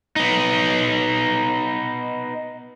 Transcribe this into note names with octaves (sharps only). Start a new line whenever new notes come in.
B3 D#4